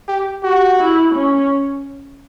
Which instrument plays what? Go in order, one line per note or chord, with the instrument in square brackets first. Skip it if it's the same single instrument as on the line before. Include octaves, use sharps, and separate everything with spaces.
[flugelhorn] G4
[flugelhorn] F#4 [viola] G4
[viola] E4
C#4